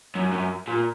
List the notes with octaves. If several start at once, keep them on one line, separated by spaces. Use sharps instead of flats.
F#2
F#2
A#2